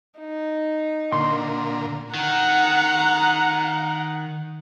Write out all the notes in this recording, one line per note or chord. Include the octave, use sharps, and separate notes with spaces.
D#4
A#2 D3 A#4 C6
D#3 F#5 A#5